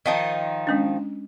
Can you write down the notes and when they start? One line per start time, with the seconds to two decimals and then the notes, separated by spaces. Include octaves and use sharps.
0.06 D#3 F3 D#4 D#5
0.67 G#3 C#4 D4